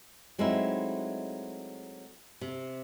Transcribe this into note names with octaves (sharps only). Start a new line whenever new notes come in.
F#3 G#3 A3 C4 D#4 E4
C3